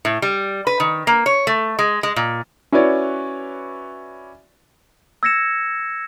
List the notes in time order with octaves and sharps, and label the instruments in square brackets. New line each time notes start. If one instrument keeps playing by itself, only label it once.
[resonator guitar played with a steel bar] A2
G3
B4
D#3
A#3
C#5
A3
G#3
G#3
A#2
[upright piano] C#4 E4 F#4 B4 C#5 D5
[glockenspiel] E6 G#6 A#6 C#7 E7